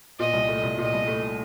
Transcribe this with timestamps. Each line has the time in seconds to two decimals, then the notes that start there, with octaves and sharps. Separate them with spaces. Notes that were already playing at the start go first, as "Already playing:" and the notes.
0.19 A#2 D#5
0.33 C2
0.49 A3
0.63 C2
0.78 A#2 D#5
0.93 C2
1.08 A3